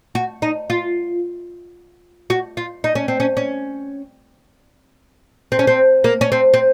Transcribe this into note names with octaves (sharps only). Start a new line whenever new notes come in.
F#4
D#4
F4
F#4
F4
D#4
C#4
C4
C#4
C#4
C4
C#4
C4
A#3
C#4
C4
C4